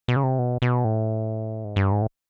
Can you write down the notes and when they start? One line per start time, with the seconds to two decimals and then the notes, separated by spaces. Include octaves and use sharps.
0.08 B2
0.16 C#3
0.23 C3
0.39 B2
0.62 B2
0.85 A2
1.64 G#2
1.76 G2
1.92 G#2
2.02 A2